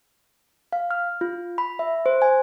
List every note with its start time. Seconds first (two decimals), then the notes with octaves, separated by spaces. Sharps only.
0.72 F5
0.91 F6
1.21 F4
1.58 B5
1.79 E5
2.06 C5
2.22 G#5